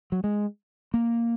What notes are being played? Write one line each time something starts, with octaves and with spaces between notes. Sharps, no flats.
F#3
G#3
A#3